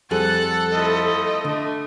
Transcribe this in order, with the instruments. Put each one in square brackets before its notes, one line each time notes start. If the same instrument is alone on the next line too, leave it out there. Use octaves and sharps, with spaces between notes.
[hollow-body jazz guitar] F2 G3 G#4 [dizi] A4 [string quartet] F#5 F#6 A6
[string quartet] F3 A3 E4 [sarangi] D#5
[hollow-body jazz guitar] D3 [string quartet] A3